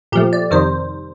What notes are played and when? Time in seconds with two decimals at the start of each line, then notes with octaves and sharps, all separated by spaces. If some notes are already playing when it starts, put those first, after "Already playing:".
0.12 A#2 F3 A3 G4
0.33 D5
0.51 F2 C3 D#3 G3 C5